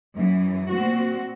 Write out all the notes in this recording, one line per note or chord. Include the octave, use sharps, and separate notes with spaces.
F#2 E3
A#2 C4 F#4